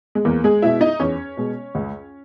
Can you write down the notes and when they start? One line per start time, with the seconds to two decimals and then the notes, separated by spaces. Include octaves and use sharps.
0.15 G#3
0.25 E2 A#3
0.44 G#3 G#4
0.62 B2 G#3 E4 E5
0.81 D#4 D#5
1.00 E2 C#4 C#5
1.37 B2 G#3
1.75 C#2